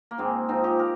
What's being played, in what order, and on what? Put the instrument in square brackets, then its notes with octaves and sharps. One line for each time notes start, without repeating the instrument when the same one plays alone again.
[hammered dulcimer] A#3
G#2 D#3 G#3 C4
G#2 F3 C4 D#4
D#4 G4
G4 A#4